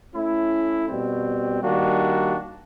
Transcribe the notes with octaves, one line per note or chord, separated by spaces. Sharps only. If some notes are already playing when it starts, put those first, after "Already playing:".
A3 C#4 E4
B2 G3 C4
D#3 G3 A#3 D4 F#4